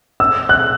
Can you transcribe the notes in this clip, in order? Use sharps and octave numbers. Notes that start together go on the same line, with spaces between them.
E6
F#6